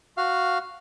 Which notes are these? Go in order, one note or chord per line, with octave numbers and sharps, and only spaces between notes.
F#4 F5